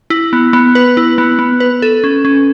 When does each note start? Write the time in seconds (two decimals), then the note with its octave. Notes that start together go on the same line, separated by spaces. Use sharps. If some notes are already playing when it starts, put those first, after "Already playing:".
0.10 E4
0.33 B3
0.53 B3
0.75 B4
0.97 E4
1.18 B3
1.39 B3
1.60 B4
1.82 A4
2.04 C#4
2.25 C#4